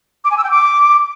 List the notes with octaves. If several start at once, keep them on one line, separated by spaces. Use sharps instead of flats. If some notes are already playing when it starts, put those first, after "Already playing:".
D6
G#5
E6
G5
D6